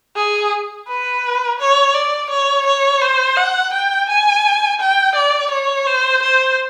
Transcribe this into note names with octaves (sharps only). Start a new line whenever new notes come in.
G#4
B4
C#5
D5
C#5
C#5
C5
F#5
G5
G#5
G5
D5
C#5
C5
C5